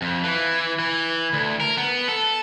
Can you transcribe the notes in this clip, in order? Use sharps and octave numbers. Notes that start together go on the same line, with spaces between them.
F2
E3
E3
D2
A#4
B3
A4